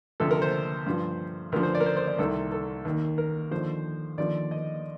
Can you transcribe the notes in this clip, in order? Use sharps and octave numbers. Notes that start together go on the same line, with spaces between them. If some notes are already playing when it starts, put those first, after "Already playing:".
D2 C3 F3 A4
A#4
C5
G2 F3
D2 D3 F3 A#4
C5
D5
A#4
C5
C5
D5
C2 C3 D#3 A4
A4
D#2 D#3
A#4
D#2 D3 F3 C5
D#2 D3 F3 D5
D#5